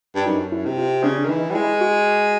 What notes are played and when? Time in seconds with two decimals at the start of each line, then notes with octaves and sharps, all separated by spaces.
0.15 G2
0.26 F#2 D#4
0.52 E4
0.65 C3
0.78 F4
1.03 C#3 D4
1.25 D#3
1.29 E3 D#4
1.50 G3
1.55 G#3 E4
1.81 F#4